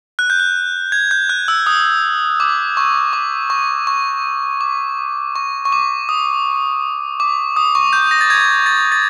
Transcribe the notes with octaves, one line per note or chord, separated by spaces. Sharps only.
F#6
G6
F#6
G#6
G6
F#6
E6
D#6
D6
C#6
D6
C#6
C#6
D6
C#6
C#6
D6
D#6
D6
D#6
C#6
G6
A#6
A6
G#6
A6
A6